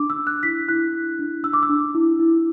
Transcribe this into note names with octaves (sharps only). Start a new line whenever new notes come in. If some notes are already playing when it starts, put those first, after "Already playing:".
Already playing: D4 D6
E6
D4
F#6
E4 B6
E4 F#6
D4
D4
D4 E6
D6
E6
D4
E4
E4